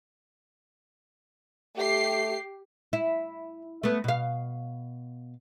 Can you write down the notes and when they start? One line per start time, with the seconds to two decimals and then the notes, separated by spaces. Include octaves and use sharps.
1.77 A3 G4 C7
2.93 E4
3.83 A3 B3
4.04 B2 F5